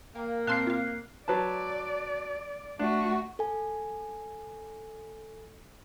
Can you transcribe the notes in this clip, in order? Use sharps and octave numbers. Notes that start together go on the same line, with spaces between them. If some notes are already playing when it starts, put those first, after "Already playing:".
A#3 A#4 F5 G5
A#2 C4 F5 A5 C6 F#6 C7
F4 F5
F#3 B4 D5 A5
A3 D4 F#4
A4 G#5